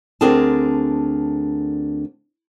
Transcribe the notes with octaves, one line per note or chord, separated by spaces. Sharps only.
D2 C4 D4 G#4 A#4 A5